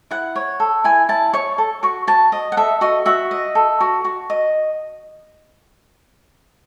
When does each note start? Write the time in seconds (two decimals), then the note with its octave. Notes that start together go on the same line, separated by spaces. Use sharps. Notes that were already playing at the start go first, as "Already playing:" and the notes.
0.11 E4 F#5
0.36 C#5
0.60 A4
0.84 E4 G#5
1.09 E4 A5
1.33 C#5 C#6
1.58 A4
1.83 F#4 C#6
2.07 F#4 A5
2.32 D#5
2.52 F#5
2.57 A4 E5
2.81 F#4 D#5
3.06 F#4 E5
3.31 D#5
3.55 A4
3.80 F#4
4.05 F#4
4.30 D#5